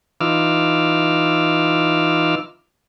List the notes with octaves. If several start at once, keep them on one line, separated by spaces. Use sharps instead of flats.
E3 D#4 F4 D6 E6 F6